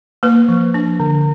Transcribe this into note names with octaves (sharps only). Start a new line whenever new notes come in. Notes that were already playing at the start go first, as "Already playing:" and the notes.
A#3 B4
F3
D4
D3